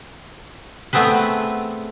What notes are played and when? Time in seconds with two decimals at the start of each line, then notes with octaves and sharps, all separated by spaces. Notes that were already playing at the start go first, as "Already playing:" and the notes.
0.93 A3 B3 C4 G#4 B4